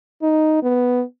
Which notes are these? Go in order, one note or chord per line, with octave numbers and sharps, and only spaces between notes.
D#4
B3